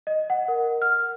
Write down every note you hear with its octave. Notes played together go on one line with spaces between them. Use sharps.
D#5
F#5
A#4
F6